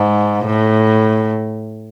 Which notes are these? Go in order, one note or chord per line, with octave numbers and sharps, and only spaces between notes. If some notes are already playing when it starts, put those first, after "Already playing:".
Already playing: G#2
A2